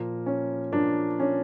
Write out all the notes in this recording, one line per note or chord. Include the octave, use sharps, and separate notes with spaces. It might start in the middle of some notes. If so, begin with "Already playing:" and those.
Already playing: A#2 F3 A#3
C#4
A#2 F3 A#3 D4
C#4